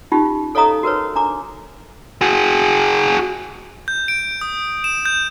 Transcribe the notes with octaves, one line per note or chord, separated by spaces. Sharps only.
C#4 D#4 F4 G4
A4 C#5 D#5 F5 A#5 D#6
F#4 A#4 B4 C#5
D4 A#5 D6
F#4 G#4
G6
D7
D#6
E7
G6